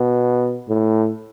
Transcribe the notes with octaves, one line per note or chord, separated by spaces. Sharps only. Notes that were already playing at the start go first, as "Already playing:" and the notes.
Already playing: B2
A2